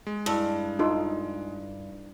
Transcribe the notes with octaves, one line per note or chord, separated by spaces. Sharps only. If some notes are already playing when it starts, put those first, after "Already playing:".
G#3
G2 E4 A5 E6
D#4 F4 A4 C6